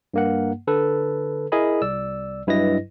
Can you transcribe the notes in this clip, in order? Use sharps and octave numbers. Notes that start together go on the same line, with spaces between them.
G2 A#3 F#5
D3 A4 B4
E4 G#4 A#4 D#5 G#5 B5
C2 D5 E6
G2 F#3 E4 B4 D#5 A#6